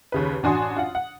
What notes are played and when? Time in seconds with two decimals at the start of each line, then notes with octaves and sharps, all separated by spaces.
0.12 D#2 C#3 B4
0.43 A1 D4 F#4 G#5 C6 D#6
0.77 F4 F#5
0.95 F#5